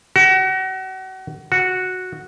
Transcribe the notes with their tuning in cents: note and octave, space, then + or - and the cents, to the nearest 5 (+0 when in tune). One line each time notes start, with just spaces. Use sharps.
F#4 +35
F#4 -5